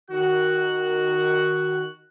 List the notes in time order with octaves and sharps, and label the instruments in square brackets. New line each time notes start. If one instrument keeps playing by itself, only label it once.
[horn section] D#3 F#4 [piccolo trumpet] F#6